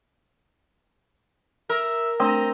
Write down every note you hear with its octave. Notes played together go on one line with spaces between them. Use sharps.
A#4 E5
A3 C4 D4 D#5 A#5